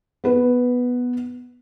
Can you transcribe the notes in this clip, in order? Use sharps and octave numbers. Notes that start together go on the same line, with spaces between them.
B3 B4